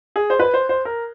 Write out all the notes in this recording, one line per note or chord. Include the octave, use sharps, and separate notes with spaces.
G#4
C5
B4
C5
C5
A#4